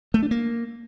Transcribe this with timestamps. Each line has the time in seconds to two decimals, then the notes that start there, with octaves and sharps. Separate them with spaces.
0.14 A3
0.23 D4
0.31 A#3